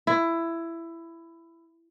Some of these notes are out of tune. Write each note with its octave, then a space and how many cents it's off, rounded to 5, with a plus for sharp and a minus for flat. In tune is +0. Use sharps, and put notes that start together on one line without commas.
E4 +15